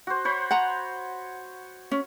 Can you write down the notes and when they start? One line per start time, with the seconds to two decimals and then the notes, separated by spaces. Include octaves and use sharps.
0.07 F#4 C5
0.25 C5 C#5 B5
0.51 F#5 A#5
1.91 C#4